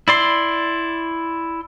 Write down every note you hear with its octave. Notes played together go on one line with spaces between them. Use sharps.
E4 D5 C6